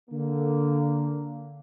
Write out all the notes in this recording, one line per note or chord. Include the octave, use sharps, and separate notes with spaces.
D3 A#3